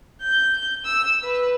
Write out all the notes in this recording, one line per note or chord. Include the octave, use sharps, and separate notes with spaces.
G6
E6
B4